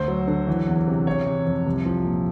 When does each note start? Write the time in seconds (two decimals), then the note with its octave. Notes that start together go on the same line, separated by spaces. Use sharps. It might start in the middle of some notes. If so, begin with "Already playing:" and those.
Already playing: D2 C5
0.08 F#3
0.27 D3
0.47 E3
0.67 E2
0.87 C3
1.07 E3 C#5
1.26 C3
1.46 F2
1.66 C2
1.86 F3
2.05 A#2